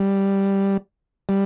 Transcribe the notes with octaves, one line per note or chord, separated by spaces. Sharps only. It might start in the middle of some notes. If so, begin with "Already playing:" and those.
Already playing: G3
G3